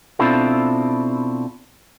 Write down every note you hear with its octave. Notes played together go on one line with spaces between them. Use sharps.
B2 C4 D4 E4 F4 A4